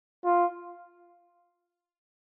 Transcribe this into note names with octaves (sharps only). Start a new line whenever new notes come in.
F4